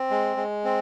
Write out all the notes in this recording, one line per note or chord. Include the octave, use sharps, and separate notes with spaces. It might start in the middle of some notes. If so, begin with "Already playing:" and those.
Already playing: C4
G#3
G#3
C4